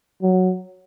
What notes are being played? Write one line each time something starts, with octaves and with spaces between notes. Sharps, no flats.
F#3